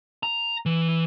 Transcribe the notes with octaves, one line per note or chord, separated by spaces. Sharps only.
A#5
E3